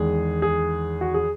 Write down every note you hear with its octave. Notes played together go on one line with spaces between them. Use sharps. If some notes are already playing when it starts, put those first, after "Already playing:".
Already playing: E2 D#3 G#3 G#4
G#4
F#4
G#4